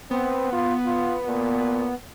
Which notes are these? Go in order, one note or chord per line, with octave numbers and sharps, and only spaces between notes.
B3 C4
F4
F4
A#2